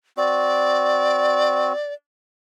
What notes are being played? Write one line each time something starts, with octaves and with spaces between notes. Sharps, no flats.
C4 F#4 D5